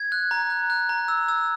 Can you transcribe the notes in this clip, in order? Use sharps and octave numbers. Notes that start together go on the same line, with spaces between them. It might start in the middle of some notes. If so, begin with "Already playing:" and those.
Already playing: G#6
F#6
A#5
F#6
F#6
A#5
E6
E6